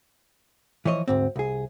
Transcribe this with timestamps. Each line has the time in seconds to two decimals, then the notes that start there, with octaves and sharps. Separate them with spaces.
0.85 E3 F3 C#5 D#5
1.08 D2 G#2 C4
1.36 C2 G#4